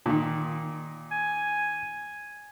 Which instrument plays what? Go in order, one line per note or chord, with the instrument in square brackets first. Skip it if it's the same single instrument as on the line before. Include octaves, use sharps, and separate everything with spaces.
[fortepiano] A#2 D#3
[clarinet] G#5